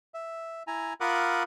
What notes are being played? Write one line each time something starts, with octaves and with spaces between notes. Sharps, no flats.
E5
E4 G#5 A#5
F4 A#4 F#5 B5 D6 D#6